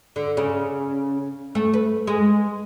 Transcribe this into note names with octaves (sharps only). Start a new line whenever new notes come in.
D3
C#3
A3
B4
G#3